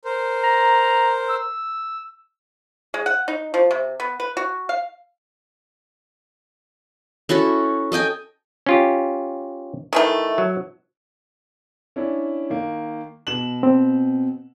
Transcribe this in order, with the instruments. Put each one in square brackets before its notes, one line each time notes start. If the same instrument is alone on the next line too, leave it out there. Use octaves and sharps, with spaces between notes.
[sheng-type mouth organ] A#4 C5
[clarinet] A#5
E6
[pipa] G#3
F#5
D#4
F3
C3
B3
B4
F#4
F5
[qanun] C#4 E4 F#4 A4
A4 D#5 G5 G#5
[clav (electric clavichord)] C#4 F4 G4
[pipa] D#3 E3 A3
[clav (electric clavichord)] F#3
[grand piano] C#4 D4 E4
D#3 A#3
B2 E7 F#7
[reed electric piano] C4